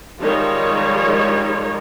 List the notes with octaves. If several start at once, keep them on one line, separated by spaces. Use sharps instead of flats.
D#3 F3 G3 G#3 D#4 C#5